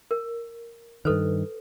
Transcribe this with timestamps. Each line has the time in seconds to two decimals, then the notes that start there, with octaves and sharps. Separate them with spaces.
0.11 A#4
1.05 G2 D#3 A4 B4 C5